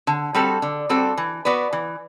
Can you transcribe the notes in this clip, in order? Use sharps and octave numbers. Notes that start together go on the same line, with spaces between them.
D3
G3 C4 F#4 A4
D3
G3 C4 F#4 A4
E3
B3 F#4 B4 D5
E3